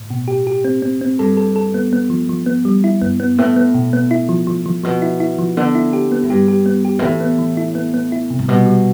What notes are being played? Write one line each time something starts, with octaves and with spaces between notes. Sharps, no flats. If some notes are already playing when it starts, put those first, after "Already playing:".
Already playing: A2
B2
G4
G4
C4
C4
C4
G2 A4
A4
A4
B3
B3
F3
F3
B3
G3
E4
G2 B3
B3
A2 B3
B3
B2
B3
E4
F3
F3
F3
B2 F3
E4
E4
F3
D3 B3
E4
G4
B3
A2
G2 G4
G4
B3
G4
B2
A2 E3
B3
E3
E4
B3
B3
E4
C3
A2
B2 G3
G3